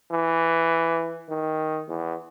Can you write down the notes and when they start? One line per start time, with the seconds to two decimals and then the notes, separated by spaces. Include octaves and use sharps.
0.12 E3
1.29 D#3
1.89 E2